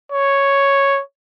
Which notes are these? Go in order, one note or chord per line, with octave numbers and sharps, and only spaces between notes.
C#5